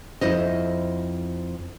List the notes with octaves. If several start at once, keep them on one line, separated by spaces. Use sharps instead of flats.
F2 E4 C5 D#5